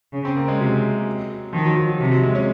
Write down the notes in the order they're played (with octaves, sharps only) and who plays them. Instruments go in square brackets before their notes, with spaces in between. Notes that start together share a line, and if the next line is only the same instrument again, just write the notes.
[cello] C#3
[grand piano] C4
A#3
G#3
[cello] C3 [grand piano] F#3
[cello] D#3 [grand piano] F3
[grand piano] F#3
F#3
F#3
[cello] C3 [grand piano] F#3
[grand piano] F#3
G#3
C#4